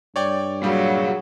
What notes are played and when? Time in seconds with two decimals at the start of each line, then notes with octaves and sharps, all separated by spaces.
0.16 G2 C#5 D5 G5
0.63 A#2 F#3 G3 G#4 F5